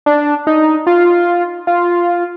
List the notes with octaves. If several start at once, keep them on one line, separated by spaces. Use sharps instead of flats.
D4
D#4
F4
F4